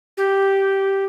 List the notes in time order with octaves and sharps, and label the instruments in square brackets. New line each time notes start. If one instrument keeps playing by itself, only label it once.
[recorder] G4